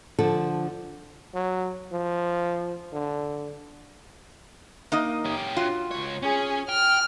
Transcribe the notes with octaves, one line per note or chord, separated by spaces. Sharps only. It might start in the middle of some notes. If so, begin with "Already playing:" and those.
D3 F3 A4
F#3
F3
D3
A#3 D#4 D#5
C#4 G4
F4 F#4
C#2 C#5
C#4 G#4
G5 F6